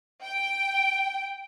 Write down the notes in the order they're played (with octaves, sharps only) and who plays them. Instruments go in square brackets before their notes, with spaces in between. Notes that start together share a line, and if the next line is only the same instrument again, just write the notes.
[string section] G5